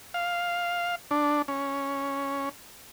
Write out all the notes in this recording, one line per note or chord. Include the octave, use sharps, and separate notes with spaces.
F5
D4
C#4